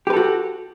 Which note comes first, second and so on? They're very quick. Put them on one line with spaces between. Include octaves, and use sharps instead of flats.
G4 B4 A4 F#4